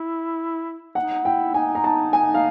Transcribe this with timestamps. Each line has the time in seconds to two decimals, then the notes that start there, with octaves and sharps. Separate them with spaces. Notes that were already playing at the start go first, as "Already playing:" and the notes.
Already playing: E4
0.95 D#4 F#5
1.25 E4 G5
1.54 D#4 G#5
1.75 A#5
1.84 A5
2.13 G#5
2.34 F5